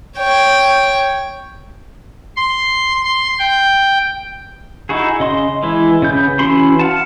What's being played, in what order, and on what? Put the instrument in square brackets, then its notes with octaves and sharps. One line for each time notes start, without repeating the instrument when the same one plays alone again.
[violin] C#5 G5
[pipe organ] C6
C6
G5
[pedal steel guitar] D#4 E4 F#4 G#4
C#3 D#5 C6
E3 G#3 E4
C#3 B3 G6
E3 C#4 F#4 B5 C6
F5 F#5 A5